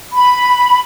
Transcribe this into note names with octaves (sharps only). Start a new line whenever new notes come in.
B5